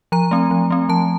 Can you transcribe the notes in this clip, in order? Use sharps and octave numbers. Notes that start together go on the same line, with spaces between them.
F3 A#5
A3 C4
F3
A3 C4
F3 A5